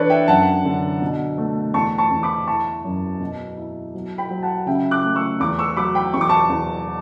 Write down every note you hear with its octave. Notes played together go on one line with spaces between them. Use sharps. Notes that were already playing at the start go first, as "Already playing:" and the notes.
Already playing: E3 D4 A4 B4 C#5 D5
E5 G5
F#2 F#5 A5
D3
B2
A3
E2 A5 C#6
A5 C#6
E2
B5 D6
E4 A5 C#6
F#2
B2
E4
F#3
G5 B5
F#3
F#5 A5
C#3 E5 G5
D6 F#6
A3
C#6 E6
E2 B5 D6
C#6 E6
F#3 B5 D6
G5 B5
E2 C#6
D6
A5 C#6
E2